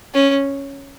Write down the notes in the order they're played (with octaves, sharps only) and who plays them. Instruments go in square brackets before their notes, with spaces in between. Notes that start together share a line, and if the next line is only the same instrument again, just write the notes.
[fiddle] C#4